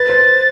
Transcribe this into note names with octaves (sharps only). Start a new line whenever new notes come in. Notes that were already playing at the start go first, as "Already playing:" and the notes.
Already playing: B4 A6
C5